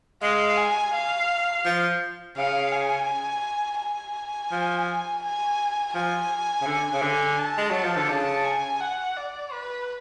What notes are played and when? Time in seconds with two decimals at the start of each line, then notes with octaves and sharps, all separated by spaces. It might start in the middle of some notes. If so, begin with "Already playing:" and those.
0.22 G#3 F5
0.58 G#5
0.94 F5
1.65 F3
2.37 C#3 F5
2.72 G#5
3.80 G#5
4.52 F3
5.23 G#5
5.94 F3 G#5
6.61 C#3
6.66 D3
6.93 C#3
7.02 D3
7.38 A5
7.57 G#3
7.70 F#3
7.84 F3
7.96 D3
8.09 C#3 A5
8.44 G#5
8.80 F#5
9.16 D5
9.53 B4